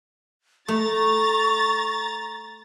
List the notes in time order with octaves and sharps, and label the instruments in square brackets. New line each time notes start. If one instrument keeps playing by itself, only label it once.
[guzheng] A3 [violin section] A#5 A6 [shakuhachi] C#6